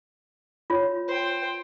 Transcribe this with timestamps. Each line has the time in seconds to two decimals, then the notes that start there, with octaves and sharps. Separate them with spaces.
0.70 F4 C#5
1.08 C5 G5